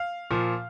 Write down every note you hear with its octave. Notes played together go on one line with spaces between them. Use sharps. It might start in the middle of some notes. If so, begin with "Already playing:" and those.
Already playing: F5
A#2 F3